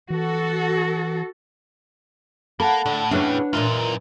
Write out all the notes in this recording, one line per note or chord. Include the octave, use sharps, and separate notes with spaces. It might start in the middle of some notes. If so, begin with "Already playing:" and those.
E3 F#4 A4
A#3 A4 F#5 A5 B5
A2 D3 A3
E2 C#3 E3 D4 B4 C#5
F#2 A#2 E3 D#4 F4